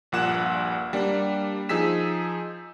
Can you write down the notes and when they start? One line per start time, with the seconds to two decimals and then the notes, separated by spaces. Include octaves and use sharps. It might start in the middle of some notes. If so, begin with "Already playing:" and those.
0.12 A#1 G2 A#2 F#5 F#6 E7
0.93 G3 A#3 D4
1.69 F3 D#4 G#4 E6 B6 E7